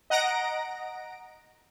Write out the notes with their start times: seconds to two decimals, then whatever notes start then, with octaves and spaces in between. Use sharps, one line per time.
0.10 D#5 F#5 A#5 A#6 D7